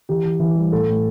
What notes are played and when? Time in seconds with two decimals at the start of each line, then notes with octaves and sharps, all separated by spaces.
0.09 E3 G4
0.25 E3
0.40 E3
0.55 G3
0.72 A2 A4
0.88 A2